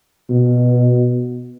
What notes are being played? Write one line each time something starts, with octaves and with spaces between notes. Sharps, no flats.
B2